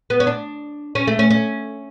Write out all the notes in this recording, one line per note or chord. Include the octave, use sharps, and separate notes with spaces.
B3
C#4
D4
C#4
A3
C#4
C#4